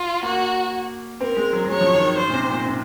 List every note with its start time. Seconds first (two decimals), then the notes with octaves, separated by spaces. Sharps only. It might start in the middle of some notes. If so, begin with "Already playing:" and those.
Already playing: F4
0.23 A#3 F#4
1.21 C4 A#4
1.37 G#3
1.53 F#3
1.65 F#3
1.69 G#3 C#5
1.81 F3
1.93 D#3
2.18 D#3 C5
2.29 A#2
2.34 C3
2.50 A#2
2.66 C3